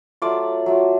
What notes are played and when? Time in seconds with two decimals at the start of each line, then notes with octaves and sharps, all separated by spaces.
0.22 F#3 A3 F4 D5 D6
0.66 F#3 A3 F4